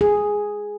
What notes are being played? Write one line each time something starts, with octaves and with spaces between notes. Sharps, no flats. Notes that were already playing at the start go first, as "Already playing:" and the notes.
G#4